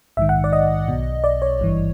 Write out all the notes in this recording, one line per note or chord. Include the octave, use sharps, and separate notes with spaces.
A#1 G#2 D#3 E5
F#5
D5
D#5
B1 B2
D5
C#5
G#1 G2 E3